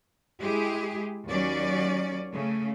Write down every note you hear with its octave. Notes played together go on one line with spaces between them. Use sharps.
G#3 E4 G4 G#4
D#2 F#3 C#4 D5
C#3 A3